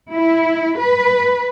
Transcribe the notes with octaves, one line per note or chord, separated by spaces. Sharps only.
E4
B4